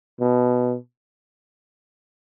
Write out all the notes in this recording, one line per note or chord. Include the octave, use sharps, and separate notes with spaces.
B2